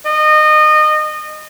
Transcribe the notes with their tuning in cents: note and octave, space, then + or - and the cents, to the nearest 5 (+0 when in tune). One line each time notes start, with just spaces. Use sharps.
D#5 -25